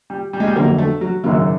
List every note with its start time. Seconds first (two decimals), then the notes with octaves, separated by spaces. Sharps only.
0.10 G3
0.33 G3
0.40 G#3
0.47 G3
0.55 G1 F2 D3 F#3 A#3
0.78 A3
1.01 F#3
1.24 G#1 F#2 C#3 F#3